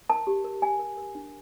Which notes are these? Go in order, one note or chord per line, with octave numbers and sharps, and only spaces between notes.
A#4 A5
G4
A#4
G4 G#5
A#4
A#4
D4